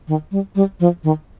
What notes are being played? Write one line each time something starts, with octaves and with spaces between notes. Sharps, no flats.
D#3
G3
G3
F3
D#3